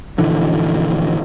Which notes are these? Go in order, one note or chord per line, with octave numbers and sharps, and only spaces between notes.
A#1 D3 E3